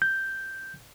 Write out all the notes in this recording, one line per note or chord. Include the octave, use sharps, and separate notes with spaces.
G6